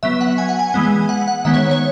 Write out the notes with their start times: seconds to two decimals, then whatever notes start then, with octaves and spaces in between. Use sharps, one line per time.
0.03 F#3 B3 E5
0.21 F#5
0.38 G#5
0.49 F#5
0.59 G#5
0.74 E3 G#3 B3
1.09 F#5
1.28 F#5
1.45 D#3 G#3 B3 E5
1.54 C#5
1.71 C#5